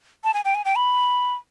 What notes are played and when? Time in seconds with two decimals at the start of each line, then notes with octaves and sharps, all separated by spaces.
0.24 A5
0.34 G#5
0.45 G5
0.55 G#5
0.65 G5
0.76 B5